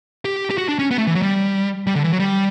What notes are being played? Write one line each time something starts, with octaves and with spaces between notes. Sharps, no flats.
G4
G4
F#4
D4
C#4
B3
A3
E3
F#3
G3
G3
D3
E3
F#3
G3